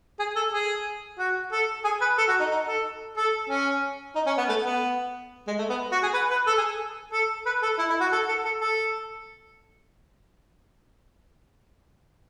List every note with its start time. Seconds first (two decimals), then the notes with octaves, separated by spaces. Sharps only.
0.19 G#4
0.36 A4
0.52 G#4
1.19 F#4
1.52 A4
1.84 G#4
2.01 B4
2.18 A4
2.28 F#4
2.40 D#4
2.51 D#4
2.66 A4
3.17 A4
3.49 C#4
4.15 D#4
4.26 C#4
4.38 B3
4.49 A3
4.65 B3
5.48 G#3
5.58 A3
5.70 B3
5.92 F#4
6.03 G#4
6.13 B4
6.30 B4
6.47 A4
6.58 G#4
7.12 A4
7.46 B4
7.63 A4
7.78 E4
7.90 E4
8.00 F#4
8.12 A4
8.28 A4
8.45 A4
8.61 A4